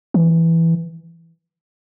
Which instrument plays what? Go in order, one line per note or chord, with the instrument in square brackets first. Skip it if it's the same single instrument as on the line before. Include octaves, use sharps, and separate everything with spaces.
[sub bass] E3